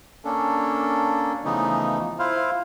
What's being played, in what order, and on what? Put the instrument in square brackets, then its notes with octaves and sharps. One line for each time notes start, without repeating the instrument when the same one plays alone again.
[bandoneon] A#3 C#4 D4 A4
C#3 E3 F3 A3 B3 D#4
E4 F4 C5 F5